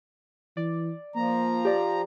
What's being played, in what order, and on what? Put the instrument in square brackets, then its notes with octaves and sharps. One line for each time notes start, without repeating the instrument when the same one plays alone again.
[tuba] E3 [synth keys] D5
[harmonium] F3 A#5 [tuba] A#3
[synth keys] G4 D5